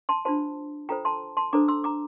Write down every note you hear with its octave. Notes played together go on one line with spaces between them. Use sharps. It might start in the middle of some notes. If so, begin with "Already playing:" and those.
A5 C6
D4 F4 C5 A5 C6
F4 A4 C5 G5 A#5
A5 C6
A5 C6
D4 A4 C5 A#5 D6
C6 E6
A#5 D6